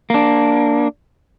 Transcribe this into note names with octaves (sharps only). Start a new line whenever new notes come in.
A#3 D4